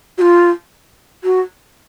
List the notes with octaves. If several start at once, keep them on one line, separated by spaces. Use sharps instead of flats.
F#4
F4
F#4